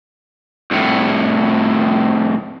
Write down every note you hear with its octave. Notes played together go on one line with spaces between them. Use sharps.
C2 A2